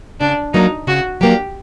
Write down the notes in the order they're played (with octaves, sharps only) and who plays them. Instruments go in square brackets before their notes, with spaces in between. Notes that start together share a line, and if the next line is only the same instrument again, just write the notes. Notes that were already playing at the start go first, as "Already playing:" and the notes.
[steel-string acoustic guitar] C#3 [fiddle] D4
[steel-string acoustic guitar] F#3 A#3 D4 [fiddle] D#4
[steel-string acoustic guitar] C#3 [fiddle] F#4
[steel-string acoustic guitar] F#3 A#3 D4 [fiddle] G4